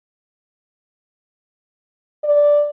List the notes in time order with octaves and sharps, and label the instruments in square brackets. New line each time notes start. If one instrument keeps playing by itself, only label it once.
[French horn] D5